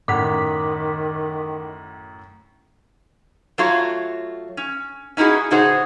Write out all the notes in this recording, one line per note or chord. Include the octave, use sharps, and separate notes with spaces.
F#2 A2 D#3 F#5 D6 B6
F#3 A3 F4 F#4 C#5
C#4
C#4 D#4 E4 F#4 G#4
A2 C#3 D#4 F#4 G#4 C5